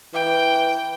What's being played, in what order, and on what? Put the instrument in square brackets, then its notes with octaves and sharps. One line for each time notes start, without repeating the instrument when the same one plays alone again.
[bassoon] E3 [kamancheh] G5